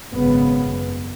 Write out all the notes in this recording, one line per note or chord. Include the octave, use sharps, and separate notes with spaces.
G#1 F#2 C#3 B3